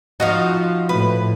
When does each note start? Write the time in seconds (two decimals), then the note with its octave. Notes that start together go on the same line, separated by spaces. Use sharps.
0.20 F3 D#4 F#4 D#5 F5
0.89 A2 B4